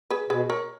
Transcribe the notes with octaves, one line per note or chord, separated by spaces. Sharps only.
G#4 B4
B2 G#4 B4
A#4 C#5